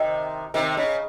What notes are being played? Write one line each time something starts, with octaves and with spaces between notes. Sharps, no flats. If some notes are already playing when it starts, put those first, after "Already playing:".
Already playing: C3 D#3
C3 D#3
C#3